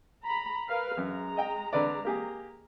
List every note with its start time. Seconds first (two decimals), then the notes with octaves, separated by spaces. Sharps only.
0.24 A#5 B5
0.68 A#4 B4 F5
0.97 F#2 G#3 A#5
1.37 D#5 G5
1.73 D3 B4 D5
2.04 A#3 G4 G#4